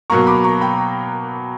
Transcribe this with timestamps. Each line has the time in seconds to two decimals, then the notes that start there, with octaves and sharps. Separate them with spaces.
0.10 B2 F#3 A#3 A#5 C#6
0.27 B5 D6
0.44 A#5 C#6
0.61 G5 B5